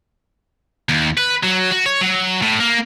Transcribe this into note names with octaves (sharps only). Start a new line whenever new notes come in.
D#2
B4
F#3
F#4
C#5
F#3
A2
A#3